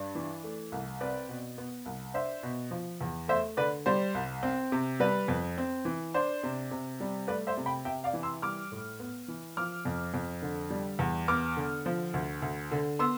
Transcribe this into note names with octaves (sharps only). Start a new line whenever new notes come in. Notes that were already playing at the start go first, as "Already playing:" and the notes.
Already playing: G2 D4
E3
A3
C2
C4 B4 D5
B2
B3
C2
D4 C5 E5
B2
F3
E2
A3 C5 E5
D3 B4 D5
G3 C5
C2
C4
C3
G3 B4
F2
C4
E3
D4 C5
C3
C3
G3
A3 B4 D5
C5 E5
C3
G5 B5
C3 E5 G5
D5 F5
E3
C6 E6
G3 D6 F6
A2
B3
E3
F3 D6 F6
F2
F2
D3
G3
E2
B3 D6 F6
D3
F3
D2
D2
D3
B3 C6 E6